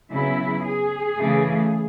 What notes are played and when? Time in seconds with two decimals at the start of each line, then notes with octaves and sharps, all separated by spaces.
0.11 C#3 F#3 B3 E4
0.64 G#4
1.17 C#3 E3 A3